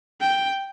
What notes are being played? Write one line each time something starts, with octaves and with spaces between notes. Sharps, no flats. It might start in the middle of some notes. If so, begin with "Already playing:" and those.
G5